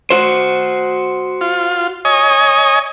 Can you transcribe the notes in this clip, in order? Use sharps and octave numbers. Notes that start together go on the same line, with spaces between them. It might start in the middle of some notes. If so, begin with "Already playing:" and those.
F#4 C5
F4
C#5 D#5 G#5